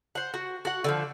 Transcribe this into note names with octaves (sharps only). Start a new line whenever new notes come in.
C5 F#5
F#4
F#4 F#5
D3 E3 F3